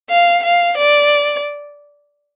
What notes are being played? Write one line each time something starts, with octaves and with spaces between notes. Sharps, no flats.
F5
F5
D5